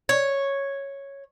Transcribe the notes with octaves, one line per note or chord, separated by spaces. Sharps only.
C#5